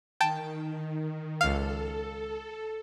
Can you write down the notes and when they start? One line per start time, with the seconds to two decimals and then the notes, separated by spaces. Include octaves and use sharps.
0.21 D#3 G5 A5
1.41 C#2 A4 F5